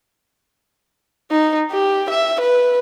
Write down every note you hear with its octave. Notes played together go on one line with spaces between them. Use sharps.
D#4
G4
E5
B4